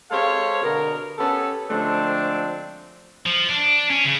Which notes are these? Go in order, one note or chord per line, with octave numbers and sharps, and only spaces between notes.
G#3 C4 G4 A4 C#5 F5
B2 D3 B3 A#4
B3 C#4 G4 A4
D3 F3 G#3 A3 C4 D4
F3
D4
C#4
C#3